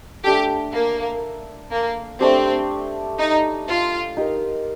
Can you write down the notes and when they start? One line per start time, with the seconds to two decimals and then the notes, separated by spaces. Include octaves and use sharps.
0.24 A3 D4 G4 A4
0.73 A#3
1.72 A#3
2.20 A3 C4 D4 G4
3.18 D#4
3.67 F4
4.17 D#4 G4 A#4